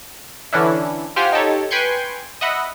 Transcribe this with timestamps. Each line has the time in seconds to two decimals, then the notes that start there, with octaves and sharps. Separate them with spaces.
0.53 D3 E3 C#4 D4 E4
1.16 F4 G4 C5 F#5 G#5 F6
1.32 D#4 G4 A4 C#5
1.71 B4 G5 G#5 C6 C#6 G6
2.41 D#5 E5 F#5 B5